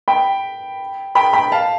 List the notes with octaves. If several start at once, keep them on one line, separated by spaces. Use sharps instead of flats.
G5 B5
G5 B5
G5 B5
F5 A5